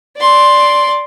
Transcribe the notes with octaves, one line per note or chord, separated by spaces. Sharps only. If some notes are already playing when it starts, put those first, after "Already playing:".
D5 C6